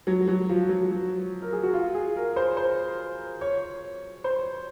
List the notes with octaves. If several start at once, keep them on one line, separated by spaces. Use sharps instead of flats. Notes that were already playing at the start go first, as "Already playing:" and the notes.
F#3
F#3
F3
F#3
F#3
A#4
G#4
F#4
F4
G#4
A#4
C5
C5
C#5
C5